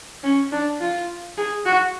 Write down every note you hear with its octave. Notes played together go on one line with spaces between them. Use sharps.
C#4
D4
F4
G#4
F#4